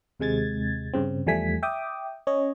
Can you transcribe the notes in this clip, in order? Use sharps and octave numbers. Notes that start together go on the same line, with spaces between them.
D#2 C3 G#3 G#6 A6
G2 C#3 C4
E2 F3 G3 A3 G#5 B6
E5 G5 D6 D#6
C#4 C#5 D#5